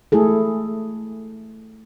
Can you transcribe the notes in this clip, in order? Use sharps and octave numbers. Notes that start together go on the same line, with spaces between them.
A3 E4 G#4 A4